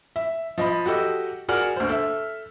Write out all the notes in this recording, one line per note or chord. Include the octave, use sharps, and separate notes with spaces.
E5
F3 D#5 B5
F#4 G4 A4 D#5
F#4 G#4 A#4 D5 F#5 F6
D2 C5
A4 E5